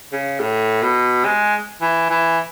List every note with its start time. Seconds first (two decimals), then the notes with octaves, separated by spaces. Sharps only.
0.12 C#3
0.40 A2
0.82 B2
1.25 G#3
1.81 E3
2.10 E3